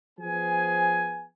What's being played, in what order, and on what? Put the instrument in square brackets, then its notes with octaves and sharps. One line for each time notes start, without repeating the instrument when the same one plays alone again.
[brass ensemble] F3 B3 G#4 G#5